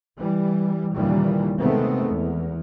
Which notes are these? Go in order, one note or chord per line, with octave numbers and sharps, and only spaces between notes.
E3 G3
D#2 A#2 C#3 E3 G3
C3 D#3 G#3 A3 B3 C4
E2